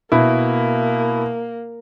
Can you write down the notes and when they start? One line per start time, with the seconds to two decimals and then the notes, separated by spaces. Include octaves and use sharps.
0.12 B2 A#3 E4